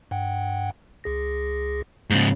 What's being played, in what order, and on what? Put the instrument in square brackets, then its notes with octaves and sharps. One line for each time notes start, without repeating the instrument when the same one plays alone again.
[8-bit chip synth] G2 F#5 G5
C#2 G#4 A#6
[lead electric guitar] G#2 C#3 [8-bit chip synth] A#3